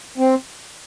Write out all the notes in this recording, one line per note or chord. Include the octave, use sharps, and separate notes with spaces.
C4